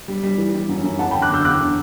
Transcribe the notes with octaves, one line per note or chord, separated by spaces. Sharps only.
G3
G3
E3
G3
F#2
F#2
E2 F#5 A5
G5 B5
D3
D6 F#6
D3 E6 G6
E2 D6 F#6
D3